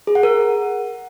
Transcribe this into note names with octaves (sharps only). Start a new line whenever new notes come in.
G#4
F#5
A#4